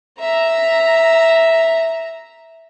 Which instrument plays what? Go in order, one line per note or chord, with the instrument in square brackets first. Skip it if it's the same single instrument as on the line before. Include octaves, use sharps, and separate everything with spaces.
[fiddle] E5 A#5